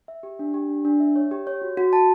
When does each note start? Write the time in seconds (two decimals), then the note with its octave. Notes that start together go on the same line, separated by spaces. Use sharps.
0.08 E5
0.23 G4
0.39 D4
0.54 G4
0.69 D4
0.85 D4
1.00 E5
1.16 C#5
1.31 G4
1.47 C#5
1.62 F#4
1.77 F#4
1.93 A5